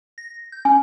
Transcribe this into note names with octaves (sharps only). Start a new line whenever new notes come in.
A#6
G6
C#4 G#5